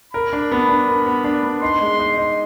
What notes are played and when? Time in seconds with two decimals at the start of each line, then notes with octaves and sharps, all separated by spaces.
0.13 A#4 B5
0.33 D4
0.52 B3
0.69 D4
0.88 A#4 B5
1.06 B3
1.24 D4
1.43 B3
1.62 D#4 C6
1.81 G#3
1.99 D#4
2.18 D#4